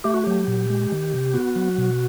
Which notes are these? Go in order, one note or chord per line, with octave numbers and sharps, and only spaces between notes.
A3 G4
F#4
F#3 G4
A#2
G#3
D#3
C3
B3 F#4
F#3
B2